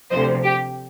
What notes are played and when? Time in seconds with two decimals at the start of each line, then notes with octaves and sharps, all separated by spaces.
0.11 D2 C3 F3 C5 D#5
0.43 G4